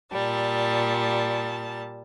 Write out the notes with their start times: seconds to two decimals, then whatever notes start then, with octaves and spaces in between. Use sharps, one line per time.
0.11 A#2 G3 A5